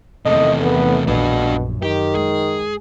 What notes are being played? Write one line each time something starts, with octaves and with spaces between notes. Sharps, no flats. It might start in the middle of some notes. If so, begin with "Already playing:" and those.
E2 C3 D#3 A3 A4 D#5
B3
A#1 B2 D4 B4
F#2
D#3 G4
G#3 G#4